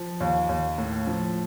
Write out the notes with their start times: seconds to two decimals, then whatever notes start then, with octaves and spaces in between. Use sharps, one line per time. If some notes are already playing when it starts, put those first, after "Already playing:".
Already playing: F3
0.20 D#2
0.49 D#2
0.78 A2
1.07 F3